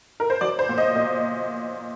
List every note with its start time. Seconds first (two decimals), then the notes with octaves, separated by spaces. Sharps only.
0.20 A#4
0.30 C5
0.41 F#3 D5
0.59 C5
0.69 A#2
0.78 D#5
0.96 A#2